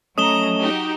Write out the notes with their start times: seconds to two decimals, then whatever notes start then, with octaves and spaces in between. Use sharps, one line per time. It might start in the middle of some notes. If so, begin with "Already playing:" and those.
0.18 F#3 A3 C#4 D#5 A#5 D#6 E7 G7
0.60 D#4 F#4 G4